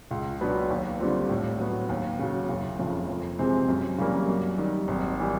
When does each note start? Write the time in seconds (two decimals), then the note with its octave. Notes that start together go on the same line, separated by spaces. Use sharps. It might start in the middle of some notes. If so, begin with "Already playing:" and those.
0.11 C#2
0.40 B2 F#3 B3 D4
0.70 D#2
1.00 D3 G3 C4 F4
1.29 A2
1.59 F#3 B3
1.89 D#2
2.19 C#3 F#3
2.49 F#1
2.79 F2 C#3
3.09 F2
3.39 C3 E3 G#3 C4
3.69 F#2
3.98 C#3 E3 G3 A#3
4.28 F#2
4.58 D#3 G3
4.88 G#1
5.19 E3 G3